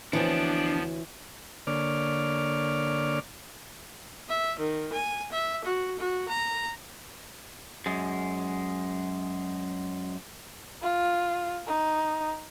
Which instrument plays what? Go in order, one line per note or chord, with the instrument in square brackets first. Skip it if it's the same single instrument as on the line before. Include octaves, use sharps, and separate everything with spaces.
[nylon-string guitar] D2 C4 C#5 [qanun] E3 [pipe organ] F3 B3 [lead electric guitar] D4
[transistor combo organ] D3 A#3 C#5 D5 D6 F6
[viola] E5
D#3
G#5
E5
F#4
F#4
A#5
[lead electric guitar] F#2 G#3
[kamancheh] F4
D#4